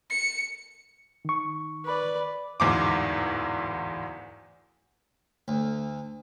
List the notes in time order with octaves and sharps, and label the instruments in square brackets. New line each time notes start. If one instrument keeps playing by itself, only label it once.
[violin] C#7
[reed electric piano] D#3 C#6
[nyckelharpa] B4 D5
[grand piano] D1 E2 G#2 D6
[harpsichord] D2